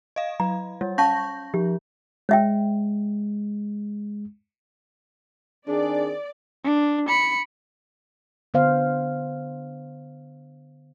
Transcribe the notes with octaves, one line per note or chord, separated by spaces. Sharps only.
D#5 F5
F#3 A#5
G3 C#5
C#4 F5 A5 C#6 G6 A#6
F3 G4
G#3 C#5 E5 G5
D#3 C4 D4 G#4 D5
D4
B5 C#7
D3 B3 C5 F5